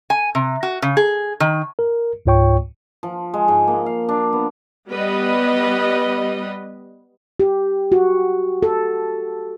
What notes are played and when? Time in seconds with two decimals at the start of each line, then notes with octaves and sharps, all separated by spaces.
0.10 G#5
0.35 C3
0.63 F#4
0.82 C#3
0.97 G#4
1.40 D#3
1.79 A#4
2.26 C#2 G#2 F4 C#5 G5 C#6
3.03 F3
3.34 G#3
3.48 G#2
3.68 A#3
3.86 F5
4.09 D4
4.33 B3
4.89 G3 B3 B4 D#5
7.40 G4
7.92 F#4
8.63 A4